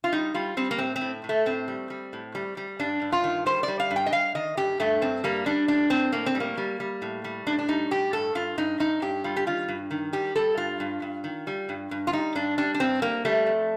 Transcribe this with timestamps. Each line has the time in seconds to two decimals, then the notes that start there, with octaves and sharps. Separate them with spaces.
0.04 F4
0.12 G3 D#4
0.34 G3 F4
0.57 G3 C4
0.71 A#3
0.78 A2 C4
0.96 C4
1.01 A2
1.24 A2
1.29 A3
1.46 A2 C4
1.68 G3
1.90 G3
2.13 A2
2.35 G3
2.57 G3
2.79 G2 D4
3.02 G2
3.12 F4
3.24 D#3
3.46 G3 C5
3.63 D5
3.68 G3
3.80 F5
3.91 G2
3.96 G5
4.06 D#5
4.12 G3 F5
4.35 D#3 D#5
4.57 G2 G4
4.80 G2 A3
5.01 G2 C4
5.24 G3 A#3
5.46 G3 D4
5.68 A2 D4
5.90 A2 C4
6.12 A2 A#3
6.26 C4
6.35 G3
6.40 A#3
6.57 G3
6.80 G3
7.02 A2
7.24 G3
7.47 A2 D4
7.59 D4
7.68 G3 D#4
7.91 A2 G4
8.13 G2 A4
8.35 G2 F4
8.57 G2 D#4
8.80 G2 D#4
9.02 G2 G4
9.24 G3 F4
9.37 G4
9.46 D#3 F4
9.68 G2
9.91 D#3
10.13 G3 G4
10.36 G3 A4
10.57 G2 F4
10.80 G2
11.02 G2
11.24 D#3
11.47 G3
11.69 G2
11.91 G2
12.07 F4
12.13 G3 D#4
12.35 G2 D4
12.58 G3 D4
12.74 D4
12.80 G2 C4
13.02 G3 A#3
13.25 G3 A3
13.47 F2